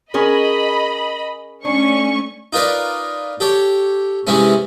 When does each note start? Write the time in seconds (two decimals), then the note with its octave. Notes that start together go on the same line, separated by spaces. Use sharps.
0.14 C#4 G#4 A#4 D#5 B5
1.65 A3 C#4 D4 C#6
2.53 D#4 F4 A#4 B4 D5
3.40 G4 A4 C#5
4.27 C3 E3 G#3 C4 C#4